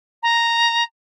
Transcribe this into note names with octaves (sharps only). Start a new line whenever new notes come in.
A#5